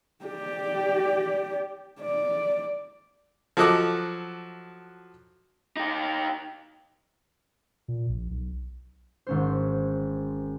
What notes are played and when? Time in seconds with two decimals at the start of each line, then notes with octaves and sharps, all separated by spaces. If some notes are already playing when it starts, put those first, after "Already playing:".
0.25 G4 D5
2.01 D5
3.57 F3 F#3 A4 D#5 F#5 D6
5.77 D#4 G4
7.88 A#2
8.09 A#1
8.31 B1
9.27 G#1 C#4 C5